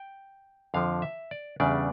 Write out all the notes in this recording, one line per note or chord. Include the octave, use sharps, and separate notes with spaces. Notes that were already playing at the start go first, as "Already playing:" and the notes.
Already playing: G5
F2 D3 F3 F5
E5
D5
E2 C#3 G3 D4 D5